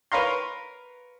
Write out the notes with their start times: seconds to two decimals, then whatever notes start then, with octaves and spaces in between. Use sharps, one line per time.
0.12 A#4 B4 C#5 F5 A#5 C6